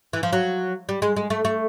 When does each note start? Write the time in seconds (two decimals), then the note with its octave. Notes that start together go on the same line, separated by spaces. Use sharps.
0.13 E3
0.23 F3
0.33 F#3
0.89 G3
1.02 G#3
1.16 G#3
1.30 A3
1.45 A3